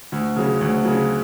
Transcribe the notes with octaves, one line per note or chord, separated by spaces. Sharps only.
D2
C#3 F#3
D2
C#3 F#3